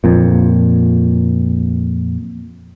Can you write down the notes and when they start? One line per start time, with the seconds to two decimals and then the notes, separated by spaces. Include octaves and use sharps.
0.04 F2 A#2